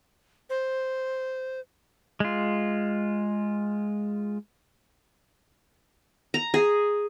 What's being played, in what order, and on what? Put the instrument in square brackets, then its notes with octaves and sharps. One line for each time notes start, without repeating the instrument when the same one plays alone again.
[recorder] C5
[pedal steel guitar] G#3 F4
[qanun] A#5
G#4